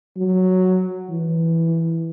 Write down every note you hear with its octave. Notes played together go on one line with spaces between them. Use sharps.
F#3
E3